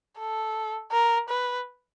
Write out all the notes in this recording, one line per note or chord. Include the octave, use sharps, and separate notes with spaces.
A4
A#4
B4